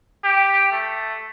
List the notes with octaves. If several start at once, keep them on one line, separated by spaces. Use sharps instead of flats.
G4
A3